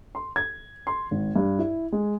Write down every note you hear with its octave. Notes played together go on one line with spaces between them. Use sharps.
C6
G#6
C6
G#1
G2
E4
G#3